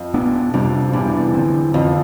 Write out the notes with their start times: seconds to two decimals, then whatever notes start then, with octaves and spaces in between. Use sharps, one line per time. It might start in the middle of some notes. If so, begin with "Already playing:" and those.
Already playing: F2
0.13 B2 B3 D4
0.53 F2 C3 G3 D4
0.93 E2 C3 G3 D4
1.34 D3 F3 C4
1.74 F2 D3 F3 C4